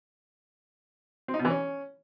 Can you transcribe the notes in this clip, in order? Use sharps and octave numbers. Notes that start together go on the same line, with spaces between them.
C4
D#4
B2
E3
C#4